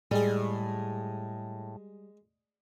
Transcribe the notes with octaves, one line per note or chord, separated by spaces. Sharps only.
A2 G3 G#3 G#4